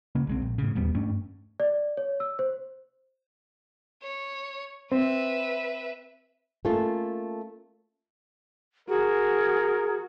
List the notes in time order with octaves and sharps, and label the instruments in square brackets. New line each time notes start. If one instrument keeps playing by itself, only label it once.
[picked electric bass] C#3 A#3 C#4
B1 G#3 C4
A#1
A2 C#3
E1 D#2 G3 B3
G2 A3 C#4 D4
[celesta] D5
C#5
E6
C5
[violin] C#5
[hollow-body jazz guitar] C4 [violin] B4 E5
[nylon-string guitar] A3 A#3 C#4 F4 A4
[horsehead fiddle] F#4 [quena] G#4 [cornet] A#4